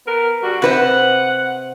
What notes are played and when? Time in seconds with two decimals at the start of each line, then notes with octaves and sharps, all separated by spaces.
0.06 B3 A#4
0.43 D3 G3 F#4
0.62 C3 B4 C5 F#5